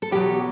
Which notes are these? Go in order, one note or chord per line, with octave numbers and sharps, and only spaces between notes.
A4
E2 B2 F#3 G4